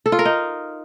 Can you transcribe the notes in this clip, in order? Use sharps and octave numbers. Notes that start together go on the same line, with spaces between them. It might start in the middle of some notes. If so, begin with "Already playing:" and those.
A4
F4
A#4
D#4